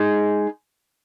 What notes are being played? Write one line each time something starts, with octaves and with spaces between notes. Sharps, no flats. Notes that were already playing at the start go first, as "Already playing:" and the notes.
Already playing: G#3 D#4 G#4